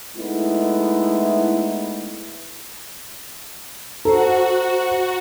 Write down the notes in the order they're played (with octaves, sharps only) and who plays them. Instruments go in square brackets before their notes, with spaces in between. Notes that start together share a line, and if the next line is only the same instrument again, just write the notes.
[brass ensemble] G#3 A3 B3 D#4 E4
[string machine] F#4 [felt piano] A4 [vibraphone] C5 A#5